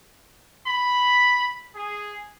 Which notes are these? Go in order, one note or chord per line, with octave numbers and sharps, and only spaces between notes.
B5
G#4